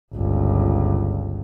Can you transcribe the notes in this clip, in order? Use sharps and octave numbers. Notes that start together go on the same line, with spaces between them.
G1 C#2